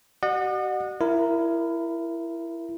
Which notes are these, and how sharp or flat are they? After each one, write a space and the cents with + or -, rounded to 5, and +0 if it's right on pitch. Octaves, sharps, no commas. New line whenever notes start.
F#4 +45 D#5 -45 F#5 -20
E4 +20 A#4 +0